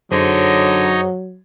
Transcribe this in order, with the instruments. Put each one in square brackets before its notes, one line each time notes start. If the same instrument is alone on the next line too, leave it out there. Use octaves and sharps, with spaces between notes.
[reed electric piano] F#2 G#4 C5 [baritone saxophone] D3 [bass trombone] F#3 [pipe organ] D#4 C#5 D#5